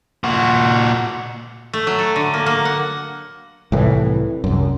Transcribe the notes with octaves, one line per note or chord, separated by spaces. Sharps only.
A#2 F#4
A3
F#3
A4
D3
A#3
A#3
F#5
C2 A2 E3
C2 F#2